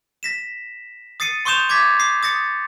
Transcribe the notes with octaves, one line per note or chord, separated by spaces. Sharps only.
A#6 B6 E7
D#6 A6 C7 C#7 D#7
C6 C#6 D#6 G6 E7 F7
D6 G#6 A6 B6
D#6 C7
D#6 A6 A#6 C#7